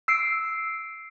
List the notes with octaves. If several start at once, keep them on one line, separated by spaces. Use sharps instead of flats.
E6 C7 D7